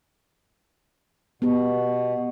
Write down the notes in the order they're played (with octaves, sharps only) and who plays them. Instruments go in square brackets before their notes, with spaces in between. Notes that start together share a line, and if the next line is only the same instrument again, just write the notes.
[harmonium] B2 [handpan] B3 G4